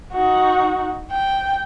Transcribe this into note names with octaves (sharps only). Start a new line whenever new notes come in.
D#4 F#4
G5